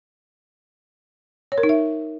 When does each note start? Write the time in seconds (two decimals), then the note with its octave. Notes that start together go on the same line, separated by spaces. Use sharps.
1.52 C#5
1.58 A#4
1.63 D#4
1.69 E5